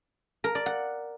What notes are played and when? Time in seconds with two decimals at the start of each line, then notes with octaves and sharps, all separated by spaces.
0.44 A#4
0.55 D5
0.66 F#5